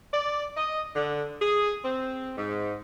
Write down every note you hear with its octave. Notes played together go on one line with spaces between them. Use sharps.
D5
D#5
D3
G#4
C4
G#2